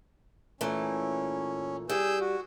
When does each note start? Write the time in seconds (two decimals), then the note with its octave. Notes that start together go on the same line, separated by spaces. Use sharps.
0.61 A#2 E3 A3 C#4
1.90 G3 G#4 E6 G6
2.20 F#4